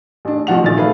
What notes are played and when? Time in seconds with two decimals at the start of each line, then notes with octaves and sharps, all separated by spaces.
0.25 A1 D4
0.47 A1 C3 F3 F#4 F7
0.63 D1 A#1 D#3 A6
0.77 A3 G#4 B4 F5